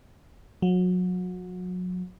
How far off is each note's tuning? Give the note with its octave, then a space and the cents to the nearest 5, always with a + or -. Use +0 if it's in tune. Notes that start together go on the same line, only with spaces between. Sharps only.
F#3 -30